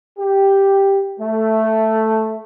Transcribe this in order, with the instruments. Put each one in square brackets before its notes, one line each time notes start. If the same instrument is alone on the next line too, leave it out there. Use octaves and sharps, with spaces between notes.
[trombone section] G4
A3